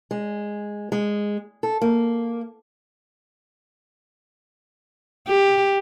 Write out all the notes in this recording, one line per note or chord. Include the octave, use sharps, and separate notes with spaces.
G#3
G#3
A4
A#3
G4